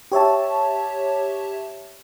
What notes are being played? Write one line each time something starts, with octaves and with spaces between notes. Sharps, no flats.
G4 C#5 E5 A5